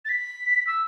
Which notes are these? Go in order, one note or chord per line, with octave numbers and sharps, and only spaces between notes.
A6
B6
E6